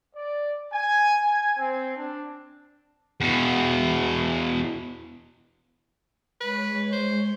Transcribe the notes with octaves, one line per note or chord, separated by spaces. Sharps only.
D5
G#5
G#5
C4
D4
E2 B2
G#3 B4 C#5
C5